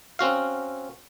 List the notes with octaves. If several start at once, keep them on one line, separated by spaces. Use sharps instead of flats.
C4 C#4 F#4 F5